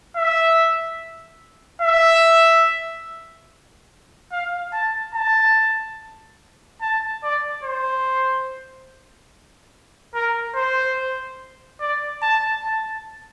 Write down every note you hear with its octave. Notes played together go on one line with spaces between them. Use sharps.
E5
E5
F5
A5
A5
A5
D5
C5
A#4
C5
D5
A5
A5